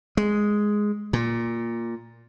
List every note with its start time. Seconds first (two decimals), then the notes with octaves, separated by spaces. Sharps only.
0.17 G#3
1.13 A#2